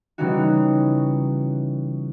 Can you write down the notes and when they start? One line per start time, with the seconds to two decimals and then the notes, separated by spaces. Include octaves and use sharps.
0.18 C#3 E3 G3 C#4 D#4 F#4